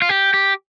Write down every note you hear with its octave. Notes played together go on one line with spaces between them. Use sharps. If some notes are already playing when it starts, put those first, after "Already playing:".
F4
G4
G4